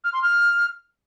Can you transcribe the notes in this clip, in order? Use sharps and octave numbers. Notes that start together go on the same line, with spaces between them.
F6
C6
F6